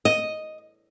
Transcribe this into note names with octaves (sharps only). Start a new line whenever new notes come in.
D#5